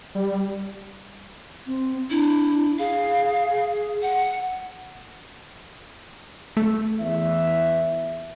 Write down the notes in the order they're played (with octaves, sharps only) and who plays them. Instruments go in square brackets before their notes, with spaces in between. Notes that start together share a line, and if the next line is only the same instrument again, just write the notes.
[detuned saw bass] G3
[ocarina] C4
[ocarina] D4 [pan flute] E4
[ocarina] G#4 [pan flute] F5
[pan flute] F#5
[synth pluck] A3
[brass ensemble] E2 E5